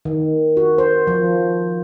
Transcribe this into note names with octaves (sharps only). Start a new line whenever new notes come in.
D#3
F#4
C5
F3